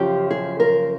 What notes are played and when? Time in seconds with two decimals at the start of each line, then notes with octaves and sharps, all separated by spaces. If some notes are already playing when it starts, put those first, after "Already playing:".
Already playing: F#2 C#3 F3 G4
0.31 G#4
0.60 A#4